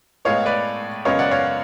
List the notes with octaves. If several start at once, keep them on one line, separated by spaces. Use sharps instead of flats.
A2 G#3 B3 C#5 F5
B4 D5
F#2 C#3 G#3 B3 C#5 F5
D5 F#5
C#5 F5